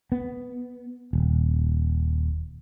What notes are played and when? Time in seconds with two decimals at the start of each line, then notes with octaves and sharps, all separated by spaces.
0.12 B3
1.13 D#1